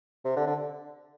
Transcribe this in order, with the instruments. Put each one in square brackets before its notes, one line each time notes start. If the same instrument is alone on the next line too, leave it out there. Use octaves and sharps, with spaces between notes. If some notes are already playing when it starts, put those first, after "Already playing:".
[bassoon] C3
D3
D3